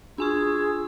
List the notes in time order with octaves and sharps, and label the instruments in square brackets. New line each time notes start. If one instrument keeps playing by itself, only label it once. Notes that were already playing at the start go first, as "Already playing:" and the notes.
[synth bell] D4 G#5 C#6 [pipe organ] F4 E6 [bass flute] G#4